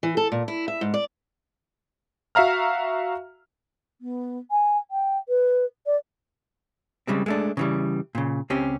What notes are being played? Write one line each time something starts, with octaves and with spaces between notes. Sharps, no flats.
E3
A4
A#2
E4
E5
G#2
D5
F#4 E5 F5 A#5 F6
B3
G#5
G5
B4
D5
C#3 G3 G#3 C4
G#3 A3 D4
C#3 E3 G3
A#2 C#3
C#2 C4 C#4 G4